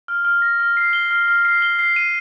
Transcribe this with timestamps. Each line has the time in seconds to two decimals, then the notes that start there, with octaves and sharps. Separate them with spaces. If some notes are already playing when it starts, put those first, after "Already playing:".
0.08 F6
0.25 F6
0.42 A#6
0.60 F6
0.77 C7
0.93 G7
1.11 F6
1.28 F6
1.45 C7
1.62 G7
1.79 C7
1.96 D#7